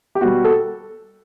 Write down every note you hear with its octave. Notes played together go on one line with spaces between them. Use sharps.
G4
B2 G3 F#4
A4